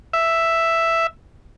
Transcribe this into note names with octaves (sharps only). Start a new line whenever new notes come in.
E5